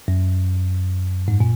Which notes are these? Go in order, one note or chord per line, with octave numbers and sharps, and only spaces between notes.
F#2
G#2
A#2